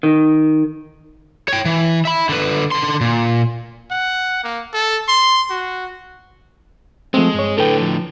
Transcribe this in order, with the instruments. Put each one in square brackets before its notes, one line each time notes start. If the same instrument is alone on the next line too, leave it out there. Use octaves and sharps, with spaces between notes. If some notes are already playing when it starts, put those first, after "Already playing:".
[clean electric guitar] D#3
[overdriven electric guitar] C#5 G5
E3
E5 B5
D3 B4
D3 C6
A#2
[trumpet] F#5
A#3
A4
C6
F#4
[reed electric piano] F3 A3 C4 [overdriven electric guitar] G#3
[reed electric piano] G2 C#5
[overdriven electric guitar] A2 D3 [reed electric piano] A4 B4 G5
[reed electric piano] F3